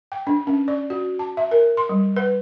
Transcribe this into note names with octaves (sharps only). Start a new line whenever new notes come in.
G5
D4
C#4
D5
F#4
A5
E5
A#4
C6
G3
B4